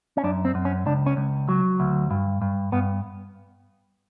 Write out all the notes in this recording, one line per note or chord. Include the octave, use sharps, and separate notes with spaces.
C#4
F#2 D4
C4
F#2
C#4
C#2 D4
C#4
C#2
F#3
D2
G2
G2
G2 B3